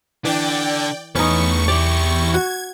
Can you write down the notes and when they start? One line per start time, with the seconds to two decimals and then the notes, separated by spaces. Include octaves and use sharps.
0.25 D3 E3 D5 G5
1.15 E2 A3 C#4 D#4 B4 C#6
1.68 E4 G4 D5
2.34 F#4 G#6